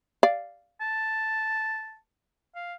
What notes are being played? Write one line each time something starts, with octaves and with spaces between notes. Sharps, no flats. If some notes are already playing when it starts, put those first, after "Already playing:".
D5 F5
A5
F5